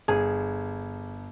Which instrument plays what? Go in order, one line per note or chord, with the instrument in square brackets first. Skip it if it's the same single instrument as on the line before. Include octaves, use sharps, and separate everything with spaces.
[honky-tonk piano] G1 [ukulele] G#4